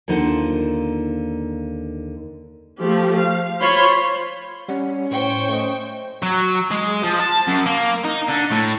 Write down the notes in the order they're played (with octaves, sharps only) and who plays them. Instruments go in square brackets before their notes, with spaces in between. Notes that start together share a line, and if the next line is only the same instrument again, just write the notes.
[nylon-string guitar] D#2 D3 D#4 F4 C5 F#5
[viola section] F3 A3 G4
F5
F4 C5 C#5 B5 C6
[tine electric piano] G3 F#5 [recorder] C#4
[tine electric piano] A2 [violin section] C5 G5 C#6
[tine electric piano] A3 D#5
[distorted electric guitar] F#3
G#3
F3
A5
F#2
A#3
D#4
D3
A2